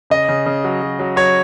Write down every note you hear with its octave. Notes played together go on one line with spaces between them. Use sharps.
C#3 D#5
C#3
C#3
F#3
F#3
F#3
F#3 C#5